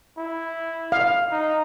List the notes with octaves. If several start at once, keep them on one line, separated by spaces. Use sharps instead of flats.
E4
F5
D#4